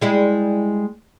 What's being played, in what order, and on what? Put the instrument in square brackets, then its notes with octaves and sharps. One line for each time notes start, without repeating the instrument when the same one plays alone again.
[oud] G3 G#3 E4